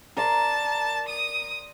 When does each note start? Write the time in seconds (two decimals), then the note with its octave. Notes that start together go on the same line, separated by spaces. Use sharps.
0.17 A#4 D5 A5 C6
1.09 D#6